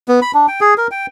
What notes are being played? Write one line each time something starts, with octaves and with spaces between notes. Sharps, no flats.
B3
B5
D4
G5
G#4
A#4
G5